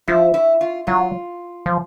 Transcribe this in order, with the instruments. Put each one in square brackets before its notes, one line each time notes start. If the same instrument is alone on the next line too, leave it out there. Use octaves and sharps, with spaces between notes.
[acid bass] F3 [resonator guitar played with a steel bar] E4
[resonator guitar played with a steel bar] E4
F4
[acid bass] F#3 [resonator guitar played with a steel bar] F4
[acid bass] F3